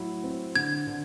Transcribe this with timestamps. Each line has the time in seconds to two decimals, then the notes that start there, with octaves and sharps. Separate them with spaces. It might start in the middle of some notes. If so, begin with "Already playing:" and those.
Already playing: A2 F#3 E4
0.23 C4
0.56 D3 G#6
0.87 D3